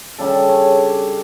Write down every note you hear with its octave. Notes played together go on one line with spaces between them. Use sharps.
C#3 G3 D4 A4
C#5